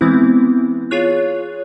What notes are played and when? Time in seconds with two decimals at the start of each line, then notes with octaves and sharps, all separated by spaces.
0.01 E3 G#3 B3 C4 E4
0.91 F4 G#4 C#5 F#6